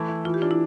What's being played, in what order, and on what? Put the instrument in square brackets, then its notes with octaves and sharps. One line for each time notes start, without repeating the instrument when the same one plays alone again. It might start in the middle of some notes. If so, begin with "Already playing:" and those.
Already playing: [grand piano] E3 A3
E4
[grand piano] E3 [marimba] F4
[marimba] G4
[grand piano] D4 [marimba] F4
[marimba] E4